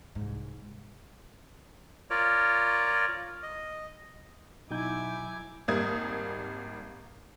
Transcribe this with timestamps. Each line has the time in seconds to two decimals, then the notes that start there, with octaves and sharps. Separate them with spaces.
0.15 C2 G#2
2.10 F4 A#4 C#5 D5
3.43 D#5
4.71 B2 F#3 D#4 E4 G#5 D6 G6
5.68 G#1 G3 A#3 D#6 G#6